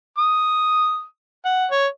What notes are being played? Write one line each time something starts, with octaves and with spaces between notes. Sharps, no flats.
D#6
F#5
C#5